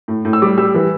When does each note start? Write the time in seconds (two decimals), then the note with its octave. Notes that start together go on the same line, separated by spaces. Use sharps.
0.08 A2
0.25 A2
0.33 E6
0.42 G3 D6
0.57 G3 E6
0.74 E3